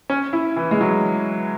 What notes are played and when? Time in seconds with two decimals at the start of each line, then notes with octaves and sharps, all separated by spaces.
0.10 C#4
0.33 E4
0.57 E3
0.71 G#3
0.81 F#3